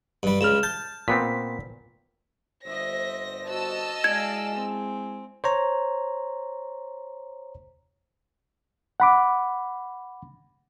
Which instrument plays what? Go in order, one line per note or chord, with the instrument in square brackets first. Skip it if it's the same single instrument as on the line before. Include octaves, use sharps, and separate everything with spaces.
[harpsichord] G2 G3
[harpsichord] C#2 C#3 [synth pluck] F6 E7
[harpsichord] A5 [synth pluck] G6 A6
[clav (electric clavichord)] A#2 B3 C4 [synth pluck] B6
[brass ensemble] G1 C5 [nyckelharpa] D#5 E5 [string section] A#6
[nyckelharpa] F#4 [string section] D#5 A5 E6
[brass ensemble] G#3 E4 G#5 [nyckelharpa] D5 F5 [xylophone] G#6
[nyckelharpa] C4
[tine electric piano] C5 C#5 A#5
[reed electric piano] F#5 B5 D6